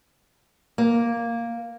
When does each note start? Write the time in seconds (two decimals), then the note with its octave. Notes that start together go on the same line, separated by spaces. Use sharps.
0.78 A#3